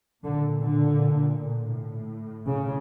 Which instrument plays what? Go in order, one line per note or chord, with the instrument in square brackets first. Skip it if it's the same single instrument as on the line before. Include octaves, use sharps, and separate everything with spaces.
[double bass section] A#2 D3
D3
A2
C#3